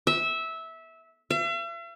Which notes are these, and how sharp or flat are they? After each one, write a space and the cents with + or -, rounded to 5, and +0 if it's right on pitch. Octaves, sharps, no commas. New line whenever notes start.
E5 -15
E5 +45